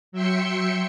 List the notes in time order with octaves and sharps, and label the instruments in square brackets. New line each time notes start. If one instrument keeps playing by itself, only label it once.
[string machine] F#3 E5 G5 C6 C#7